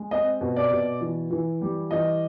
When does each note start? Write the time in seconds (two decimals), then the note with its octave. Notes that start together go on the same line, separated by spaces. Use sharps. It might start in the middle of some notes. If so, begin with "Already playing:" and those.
Already playing: G#3
0.11 C4 D#5
0.41 B2
0.56 D5
0.71 B2
1.01 E3
1.31 E3
1.61 G3
1.91 E3 D#5